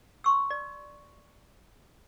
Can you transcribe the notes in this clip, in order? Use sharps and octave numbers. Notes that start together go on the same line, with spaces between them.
C6 C#6 E6
D5